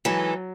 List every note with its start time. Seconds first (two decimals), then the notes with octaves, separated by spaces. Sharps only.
0.05 E3 F#3 G#3 D#4 A4